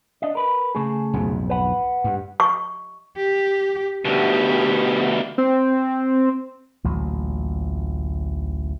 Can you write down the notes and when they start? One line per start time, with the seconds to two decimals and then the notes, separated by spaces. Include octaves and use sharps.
0.22 D4 D#5
0.35 A#4 B4
0.75 C#3 A3 G#4
1.14 B1 F2 G#2
1.50 B4 F#5
2.04 G2
2.40 C#6
3.16 G4
4.05 D2 B2 D#4 G4
5.38 C4
6.84 A1 D2 A#2 F#3